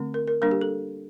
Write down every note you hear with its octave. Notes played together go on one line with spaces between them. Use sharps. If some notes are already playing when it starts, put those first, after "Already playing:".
Already playing: D3 A3 C4
A#4
A#4
G3 A#3 D4 A#4
G4
A4